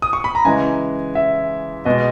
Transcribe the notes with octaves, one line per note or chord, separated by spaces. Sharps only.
D#6
C#6
B5
A#5
C#3 E3 G#3 G#5
E5
B2 G#3 D#5